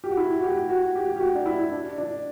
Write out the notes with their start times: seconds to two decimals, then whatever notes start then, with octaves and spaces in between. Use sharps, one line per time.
0.04 G4
0.10 F#4
0.17 E4
0.39 F#4
0.43 G4
0.69 F#4
0.95 G4
1.16 G4
1.20 F#4
1.35 D4
1.46 E4
1.72 D4
1.98 D4